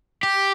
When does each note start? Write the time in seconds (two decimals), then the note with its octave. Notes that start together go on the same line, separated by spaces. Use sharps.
0.23 G4